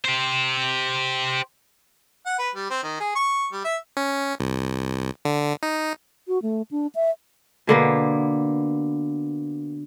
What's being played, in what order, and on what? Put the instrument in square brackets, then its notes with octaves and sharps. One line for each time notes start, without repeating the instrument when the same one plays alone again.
[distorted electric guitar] G4 C5
[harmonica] F#5
B4
G3
C4
D#3
G#4
C#6
G3
E5
[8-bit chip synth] C#4
C2
D3
D#4
[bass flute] F#4
A3
D4
E5
[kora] B2 D3 A#3 B3